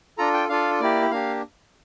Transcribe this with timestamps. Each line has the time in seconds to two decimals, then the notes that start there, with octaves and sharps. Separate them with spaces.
0.18 D4 F4 A4 A#5
0.34 G5
0.49 D4 F4 A4 F5
0.80 A#3 E4 G4 D5
1.11 A#3 D4 G4 F5